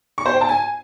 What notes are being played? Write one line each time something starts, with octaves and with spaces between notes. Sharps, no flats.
C#6
C5
G5
A5
G#5